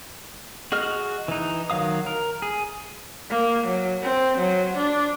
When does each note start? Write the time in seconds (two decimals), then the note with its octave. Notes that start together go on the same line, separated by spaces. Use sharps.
0.72 F#4 G#4 D#5 F6
1.28 E3 D#4
1.70 D#3 F#3 F5 D#6
2.06 A#4
2.42 G#4
3.30 A#3
3.65 F#3
4.02 C4
4.38 F#3
4.77 D4